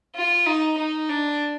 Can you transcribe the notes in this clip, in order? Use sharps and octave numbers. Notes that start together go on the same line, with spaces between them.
F4
D#4
D#4
D4